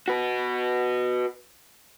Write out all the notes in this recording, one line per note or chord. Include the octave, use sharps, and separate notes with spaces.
F#4 B4